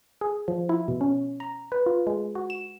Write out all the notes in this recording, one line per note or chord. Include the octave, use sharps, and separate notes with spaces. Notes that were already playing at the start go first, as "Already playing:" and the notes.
G#4
F3
E4
B2
C#4
A#5
B4
F4
G#3
F#4
E7